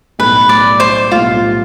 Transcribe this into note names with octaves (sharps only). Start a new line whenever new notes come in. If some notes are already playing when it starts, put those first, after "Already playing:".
B1 A2 G3 B4
D5
C5
B1 A2 G3 F4